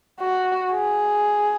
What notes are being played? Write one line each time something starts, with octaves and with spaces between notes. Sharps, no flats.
F#4
G#4